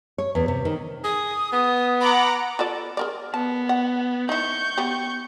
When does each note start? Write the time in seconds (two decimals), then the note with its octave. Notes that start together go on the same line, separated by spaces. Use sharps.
0.18 C#5
0.35 E2
0.48 C3
0.65 D#3
1.04 G#4 D#6
1.53 B3 D#6
2.01 F#5 A#5 B5 D6
2.59 F4 A4 D5
2.97 G#4 A#4 D5
3.34 B3 A5
3.69 F#5
4.29 D#4 E4 C#6 G6
4.78 B3 G4